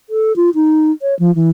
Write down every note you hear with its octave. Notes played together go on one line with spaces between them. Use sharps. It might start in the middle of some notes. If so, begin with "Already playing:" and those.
A4
F4
D#4
C#5
F3
E3